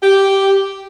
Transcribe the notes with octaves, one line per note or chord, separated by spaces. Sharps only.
G4